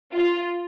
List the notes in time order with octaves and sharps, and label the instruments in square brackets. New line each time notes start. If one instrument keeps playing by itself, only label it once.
[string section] F4